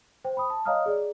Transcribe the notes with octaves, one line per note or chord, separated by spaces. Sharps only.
C5 G5
B5 D#6
A5
C#5 D#5 F5 A#5 D#6 F6
G#4 D5